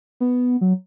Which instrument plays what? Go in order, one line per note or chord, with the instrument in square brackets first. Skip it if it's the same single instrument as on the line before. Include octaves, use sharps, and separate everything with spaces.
[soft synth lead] B3
F#3